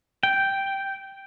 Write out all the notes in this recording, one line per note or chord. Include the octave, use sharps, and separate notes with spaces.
G5